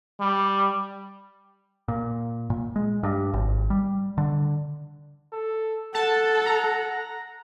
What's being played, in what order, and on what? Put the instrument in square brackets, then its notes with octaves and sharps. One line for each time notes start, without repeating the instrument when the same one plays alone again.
[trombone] G3
[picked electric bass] A#2
A#2
G#3
G2
G#1
G3
D3
[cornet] A4
[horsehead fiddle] A4 [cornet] F#5 [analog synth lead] A5
[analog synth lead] A#5